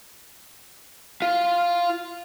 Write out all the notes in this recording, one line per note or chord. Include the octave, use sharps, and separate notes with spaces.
F4 F5